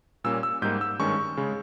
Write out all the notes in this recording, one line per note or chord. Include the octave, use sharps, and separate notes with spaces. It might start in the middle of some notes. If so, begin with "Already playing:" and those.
A#2 G3 A#3 C#4 E6
E6
G#2 G3 A#3 D#4 G6
E6
G2 D#3 G#3 C#4 C#6
C#3 G#3